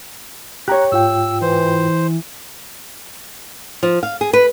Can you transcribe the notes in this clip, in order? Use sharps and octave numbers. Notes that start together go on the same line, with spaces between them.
G4 C#5 A#5 F#6
G#2 F4 G5 E6
E3 C5
F3
F5
G#4
B4